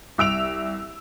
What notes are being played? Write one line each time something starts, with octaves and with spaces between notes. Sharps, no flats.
C2 E6 D7 F7